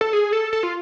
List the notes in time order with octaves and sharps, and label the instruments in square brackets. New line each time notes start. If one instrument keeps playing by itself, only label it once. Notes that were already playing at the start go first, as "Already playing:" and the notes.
[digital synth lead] A4
G#4
A4
A4
F4